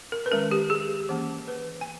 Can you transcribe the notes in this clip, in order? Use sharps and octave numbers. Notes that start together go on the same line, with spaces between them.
A#4
B4
D#3 G#3 C#4 A#4
G4
G#4
E3 A#3 C#4
B4
G#5